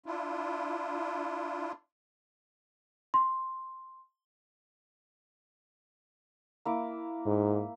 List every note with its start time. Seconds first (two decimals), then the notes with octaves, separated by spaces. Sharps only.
0.06 D4 E4 F4
3.14 C6
6.65 A#3 E4 D6
7.26 G#2